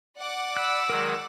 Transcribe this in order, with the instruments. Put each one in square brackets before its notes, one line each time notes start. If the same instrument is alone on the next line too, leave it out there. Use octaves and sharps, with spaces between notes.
[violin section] D5 F#5 D6
[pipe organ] B5 [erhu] E6 [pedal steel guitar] F#6
[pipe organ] D#3 F#3 G#3 [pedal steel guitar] A#4